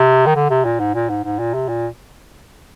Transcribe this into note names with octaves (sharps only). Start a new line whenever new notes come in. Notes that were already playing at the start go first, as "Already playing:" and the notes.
Already playing: C3
D#3
D3
C3
A#2
G#2
A#2
G#2
G#2
A#2
C3
A#2